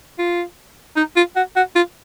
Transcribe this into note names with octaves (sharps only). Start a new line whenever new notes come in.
F4
D#4
F4
F#4
F#4
F4